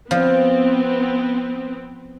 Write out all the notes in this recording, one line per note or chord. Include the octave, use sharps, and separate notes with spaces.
F3 B3 C4